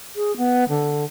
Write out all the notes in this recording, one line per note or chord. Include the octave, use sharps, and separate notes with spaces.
G#4
B3
D3